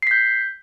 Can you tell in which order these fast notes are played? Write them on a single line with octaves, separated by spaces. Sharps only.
C7 B6 G6